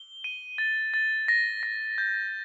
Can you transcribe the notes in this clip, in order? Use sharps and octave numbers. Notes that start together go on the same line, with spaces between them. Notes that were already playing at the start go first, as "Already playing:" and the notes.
Already playing: G7
D#7
A6
A6
A#6
A#6
G6